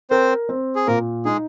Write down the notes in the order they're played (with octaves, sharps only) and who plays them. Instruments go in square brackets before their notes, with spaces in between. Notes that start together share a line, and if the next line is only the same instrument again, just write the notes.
[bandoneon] C4 C5 [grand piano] A#4
[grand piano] C4
[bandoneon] G#4
[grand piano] A#2 [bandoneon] A#3 A#4
[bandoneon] G#3 G#4 [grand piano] D#4